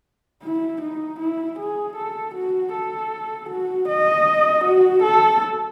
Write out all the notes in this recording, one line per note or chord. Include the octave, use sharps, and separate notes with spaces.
E4
D#4
E4
G#4
A4
F#4
A4
F#4
D#5
F#4
A4